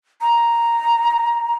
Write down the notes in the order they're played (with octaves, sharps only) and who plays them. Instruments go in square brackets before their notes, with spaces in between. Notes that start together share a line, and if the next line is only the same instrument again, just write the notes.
[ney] A#5